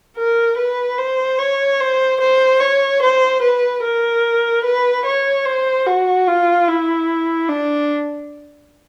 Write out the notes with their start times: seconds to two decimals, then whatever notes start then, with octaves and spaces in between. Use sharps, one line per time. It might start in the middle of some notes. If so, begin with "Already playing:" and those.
0.17 A#4
0.57 B4
0.98 C5
1.39 C#5
1.80 C5
2.20 C5
2.60 C#5
3.02 C5
3.42 B4
3.83 A#4
4.64 B4
5.05 C#5
5.46 C5
5.87 F#4
6.27 F4
6.68 E4
7.49 D4